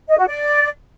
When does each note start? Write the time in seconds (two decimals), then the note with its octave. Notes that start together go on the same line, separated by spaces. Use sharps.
0.09 D#5
0.18 F#4
0.27 D5